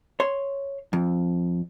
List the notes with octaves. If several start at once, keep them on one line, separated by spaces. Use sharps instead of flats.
C#5 C6
F2